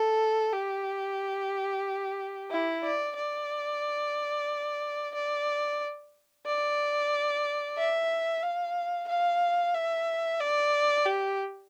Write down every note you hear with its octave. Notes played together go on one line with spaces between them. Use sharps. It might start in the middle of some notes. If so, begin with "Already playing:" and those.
Already playing: A4
G4
E4
D5
D5
D5
D5
E5
F5
F5
E5
D5
G4